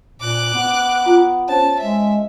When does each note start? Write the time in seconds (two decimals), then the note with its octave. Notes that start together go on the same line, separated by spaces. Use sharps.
0.20 A#2 D6 F#6
0.54 B3
1.05 F4 A#5
1.49 C#4 C5 C#5 A5
1.80 G#3 E5